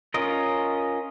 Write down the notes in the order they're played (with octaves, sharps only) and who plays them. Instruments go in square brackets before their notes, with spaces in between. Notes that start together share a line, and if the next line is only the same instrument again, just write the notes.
[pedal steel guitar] C#4 F4 A#4 D#5